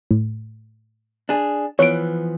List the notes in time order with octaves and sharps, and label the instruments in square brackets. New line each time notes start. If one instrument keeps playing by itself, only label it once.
[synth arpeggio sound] A2
[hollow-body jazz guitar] D4 G#4
[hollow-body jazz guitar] E3 F3 B3 [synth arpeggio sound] C#5 D7